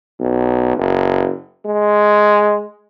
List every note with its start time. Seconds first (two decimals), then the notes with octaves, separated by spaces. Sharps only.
0.20 B1
0.77 F#1
1.66 G#3